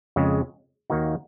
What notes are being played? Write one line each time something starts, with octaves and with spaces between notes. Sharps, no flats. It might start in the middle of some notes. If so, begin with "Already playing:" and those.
F2 C#3 G#3
D#2 D#3 A#3 D#4 F#4